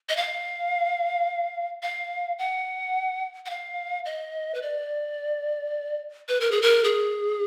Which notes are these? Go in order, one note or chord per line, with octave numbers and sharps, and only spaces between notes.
D#5
F5
F5
F#5
F#5
F5
D#5
B4
D5
B4
A#4
G#4
A#4
G#4